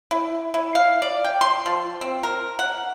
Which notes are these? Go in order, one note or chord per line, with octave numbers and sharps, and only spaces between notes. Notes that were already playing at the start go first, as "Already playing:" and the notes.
E4
E4
F5
D5
G5
C6
F3
C4
A#4
F#5